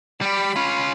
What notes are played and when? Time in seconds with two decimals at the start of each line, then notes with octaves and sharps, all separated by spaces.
0.21 G3 G4 B5
0.56 C#4 F4